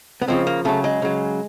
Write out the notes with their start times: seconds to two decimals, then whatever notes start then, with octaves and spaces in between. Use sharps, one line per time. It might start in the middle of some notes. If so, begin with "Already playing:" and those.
0.22 B3
0.28 C#3 F3 G#3 C4
0.47 A#3
0.65 C#3 F#3 A3
0.84 G#3
1.02 C#3 F#3